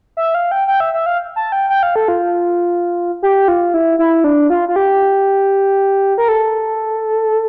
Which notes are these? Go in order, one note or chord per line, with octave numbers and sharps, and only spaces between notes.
E5
F5
G5
G5
E5
E5
F5
A5
G5
G5
F5
A4
F4
G4
F4
E4
E4
D4
F4
F4
G4
A#4
A4